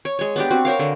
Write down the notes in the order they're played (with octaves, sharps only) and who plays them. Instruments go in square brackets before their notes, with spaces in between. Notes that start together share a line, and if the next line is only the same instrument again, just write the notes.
[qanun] C#5
G#3 C#5
B3 D4 G4
C4 F#4
A#4 C5 C#5 F5
D3